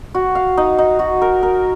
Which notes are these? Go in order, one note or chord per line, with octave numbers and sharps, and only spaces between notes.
F#4
F5
D#4
D#4
F#4
A#4
A#4